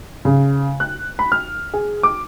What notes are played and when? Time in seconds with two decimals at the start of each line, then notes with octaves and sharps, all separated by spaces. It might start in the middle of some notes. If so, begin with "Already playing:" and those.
0.25 C#3
0.80 F#6
1.19 B5
1.32 F6
1.74 G#4
2.03 D6